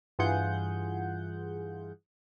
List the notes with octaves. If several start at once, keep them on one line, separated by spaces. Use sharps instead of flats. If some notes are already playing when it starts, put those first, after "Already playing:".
G2 E3 F4 G#4 F#5 G6